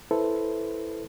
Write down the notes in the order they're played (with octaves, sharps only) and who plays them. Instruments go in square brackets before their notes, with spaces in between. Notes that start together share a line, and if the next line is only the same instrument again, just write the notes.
[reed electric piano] E4 A4 B4 C5